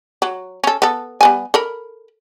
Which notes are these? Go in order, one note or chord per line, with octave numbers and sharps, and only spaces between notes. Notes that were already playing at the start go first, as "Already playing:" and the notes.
F#3
C#4 A4
B3 A4
G3 B3 G#5
A4 A#4 B5